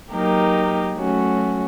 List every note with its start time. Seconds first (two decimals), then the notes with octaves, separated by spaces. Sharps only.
0.12 F#3 A#3 D#4 G4 A#4
0.95 F#3 A3 C#4 F#4